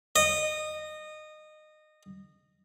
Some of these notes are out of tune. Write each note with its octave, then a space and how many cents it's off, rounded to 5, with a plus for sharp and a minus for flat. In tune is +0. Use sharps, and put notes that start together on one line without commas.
D#5 -20